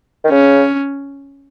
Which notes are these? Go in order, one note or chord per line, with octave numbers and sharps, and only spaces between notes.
D#3
C#3 C#4